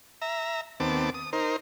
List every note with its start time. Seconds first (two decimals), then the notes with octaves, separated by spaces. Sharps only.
0.22 E5 A#5
0.80 D#2 B3 C4 A5 D6
1.14 D#6
1.33 D#4 A#4 C5